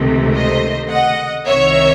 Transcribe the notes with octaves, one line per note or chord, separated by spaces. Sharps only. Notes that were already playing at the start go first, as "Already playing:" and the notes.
Already playing: C#2 C3 D#3 A3
C5 D#5
D#5 F#5
C2 C3 D#3 C#5 E5